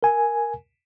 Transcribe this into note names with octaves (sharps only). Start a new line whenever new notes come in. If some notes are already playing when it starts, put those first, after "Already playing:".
A#4 G#5